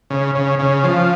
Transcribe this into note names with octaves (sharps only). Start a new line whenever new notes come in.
C#3
C#3
C#3
F3